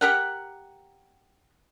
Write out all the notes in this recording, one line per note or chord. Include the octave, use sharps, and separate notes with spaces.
G4 A#4 F#5